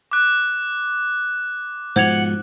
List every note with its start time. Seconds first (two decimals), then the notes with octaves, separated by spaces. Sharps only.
0.11 D6 F#6
1.96 G#2 B2 F3 C5 F#5 G#6 F7